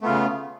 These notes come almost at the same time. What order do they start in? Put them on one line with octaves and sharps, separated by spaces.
A3 B3 F4 C#3